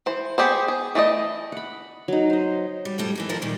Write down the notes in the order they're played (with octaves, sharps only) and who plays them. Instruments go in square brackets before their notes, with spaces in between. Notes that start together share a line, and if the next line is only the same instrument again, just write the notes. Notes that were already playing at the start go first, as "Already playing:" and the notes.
[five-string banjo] E3 C5
B3 G4 G#4 C5
G#4
E3 A3 D5 D#5
[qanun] F#5 B5
F#3 D#4
C5 D#5
[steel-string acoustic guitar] G3
F2 A2 G3 A4
E3 A#3 D#4
D2 F3 A#4 D5 D#5
A#2 D#3 G3